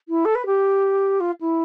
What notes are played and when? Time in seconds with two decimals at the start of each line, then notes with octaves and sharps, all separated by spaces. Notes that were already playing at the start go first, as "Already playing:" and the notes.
0.08 E4
0.25 A4
0.35 B4
0.46 G4
1.20 F4
1.40 E4